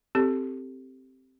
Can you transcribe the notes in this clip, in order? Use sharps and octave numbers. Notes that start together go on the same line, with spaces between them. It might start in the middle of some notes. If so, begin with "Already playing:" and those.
C4 G4 A4